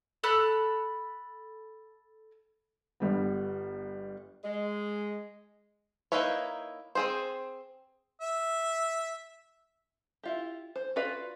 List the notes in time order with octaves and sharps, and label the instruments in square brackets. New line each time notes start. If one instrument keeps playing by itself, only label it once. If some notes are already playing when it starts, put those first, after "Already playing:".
[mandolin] A4 B5 F#6
[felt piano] G1 G3 B3
[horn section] G#3
[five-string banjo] A#3 D#4 E4 B4 C#5
C4 G#4 C5
[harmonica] E5
[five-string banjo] E4 F4 G4
C5
F4 F#4 B4 D5 F5